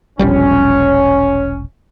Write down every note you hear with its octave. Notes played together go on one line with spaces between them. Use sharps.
E1 A#1 G3 C#4